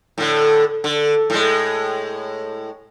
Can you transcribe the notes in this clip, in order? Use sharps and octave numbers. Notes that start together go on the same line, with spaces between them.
A2 D3
D3
A2 G#3